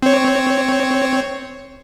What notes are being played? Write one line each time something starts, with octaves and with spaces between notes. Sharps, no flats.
C4 C#5